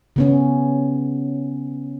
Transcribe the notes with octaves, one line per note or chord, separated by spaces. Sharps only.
C#3 B3 C#4